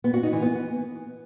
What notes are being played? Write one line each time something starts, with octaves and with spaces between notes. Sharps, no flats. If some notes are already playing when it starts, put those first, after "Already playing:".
B3
F#4
D#4
E3
B3